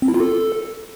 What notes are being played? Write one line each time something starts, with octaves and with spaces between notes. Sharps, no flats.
C4
E4
F4
A4